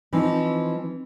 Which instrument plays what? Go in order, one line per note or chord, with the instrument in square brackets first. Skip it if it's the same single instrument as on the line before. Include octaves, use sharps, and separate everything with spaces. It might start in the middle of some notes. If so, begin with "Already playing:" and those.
[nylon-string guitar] E3 F3 C4 D#4